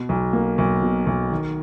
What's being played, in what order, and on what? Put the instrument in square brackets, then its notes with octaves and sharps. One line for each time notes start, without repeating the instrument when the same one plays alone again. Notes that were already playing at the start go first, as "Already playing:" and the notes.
Already playing: [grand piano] B2
B1
A#3
B1
B2
B1
D#3